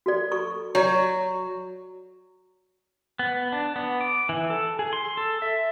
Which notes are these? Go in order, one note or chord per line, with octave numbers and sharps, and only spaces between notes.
F#4 A4 D5
A4 C#6
F#3 C#5 D5
B3
D4
B3
D6
E3
A4
G#4
C6
A4
E5